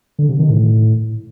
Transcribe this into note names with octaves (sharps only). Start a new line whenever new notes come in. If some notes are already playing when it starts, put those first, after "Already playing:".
D3
C3
D#3
A2